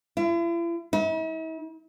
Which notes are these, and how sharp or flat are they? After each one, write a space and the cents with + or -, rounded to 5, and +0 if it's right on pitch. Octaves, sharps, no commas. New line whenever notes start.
E4 +45
E4 -45